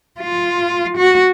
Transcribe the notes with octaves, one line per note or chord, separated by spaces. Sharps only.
F4
F#4